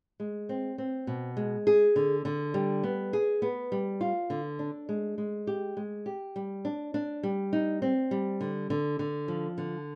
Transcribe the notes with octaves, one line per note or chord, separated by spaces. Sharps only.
G#3
C4
C4
B2
G#3
G#4
D3
D3
G3
B3
G#4
B3
G3
F4
D3
D4
G#3
G#3
G4
G#3
G4
G3
D4
D4
G3
D#4
C4
G3
D3
D3
D3
F3
D3